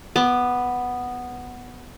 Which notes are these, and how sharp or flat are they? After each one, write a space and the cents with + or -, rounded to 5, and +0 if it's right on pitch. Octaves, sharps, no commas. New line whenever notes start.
B3 +0 D6 +20